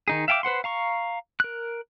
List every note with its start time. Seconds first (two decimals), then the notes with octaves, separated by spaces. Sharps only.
0.08 D#3 D#4 G#4
0.28 E5 F5 G5 G#5 D6
0.43 B4 C5 F#5 C6
0.64 F5 A#5 C#6
1.40 A#4 F#6